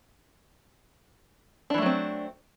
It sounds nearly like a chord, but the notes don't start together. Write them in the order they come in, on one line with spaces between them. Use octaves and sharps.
D4 E3 A3 F#3 C4